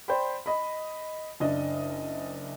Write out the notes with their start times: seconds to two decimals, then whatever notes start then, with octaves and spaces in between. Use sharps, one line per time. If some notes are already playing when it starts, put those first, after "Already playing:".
0.08 C5 D5 G5 B5
0.46 D#5 B5
1.40 F#1 D4 D#5